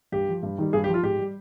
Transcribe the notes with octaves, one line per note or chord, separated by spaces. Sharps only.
G2 G4
F3
G2
D#3 G3
G2 G#4
G4
F3
F4
G#2 G4
G3